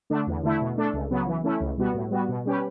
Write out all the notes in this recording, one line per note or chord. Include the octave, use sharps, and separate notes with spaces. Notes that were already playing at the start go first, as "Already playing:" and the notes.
D3 A3 D4
E2
D3 A3 E4
B2
A3 D4 A4
C#2
C#3 F#3 B3
E3
A3 C#4 E4
C#2
B2 G3 B3 F#4
A2
G3 B3 F#4
B2
G3 C#4 G4 B4